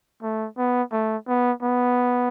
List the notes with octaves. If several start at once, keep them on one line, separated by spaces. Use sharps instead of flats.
A3
B3
A3
B3
B3